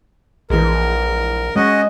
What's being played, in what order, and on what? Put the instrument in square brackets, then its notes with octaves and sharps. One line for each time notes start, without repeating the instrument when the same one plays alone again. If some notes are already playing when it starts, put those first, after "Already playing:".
[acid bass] A#1 [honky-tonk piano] E3 G#3 [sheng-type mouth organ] A#4
[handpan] G#3 [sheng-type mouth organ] C#4 F#4 D#5